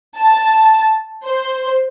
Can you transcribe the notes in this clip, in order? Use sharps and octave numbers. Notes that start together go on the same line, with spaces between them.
A5
C5